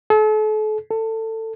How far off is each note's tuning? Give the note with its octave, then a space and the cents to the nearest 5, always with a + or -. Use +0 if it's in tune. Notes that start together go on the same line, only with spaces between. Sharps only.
A4 -40
A4 +20